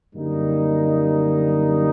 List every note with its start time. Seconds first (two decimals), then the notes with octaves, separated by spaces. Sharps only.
0.15 F#2 D3 G3 A#3 D#4